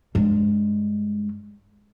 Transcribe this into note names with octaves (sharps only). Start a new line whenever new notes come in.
G2 G#3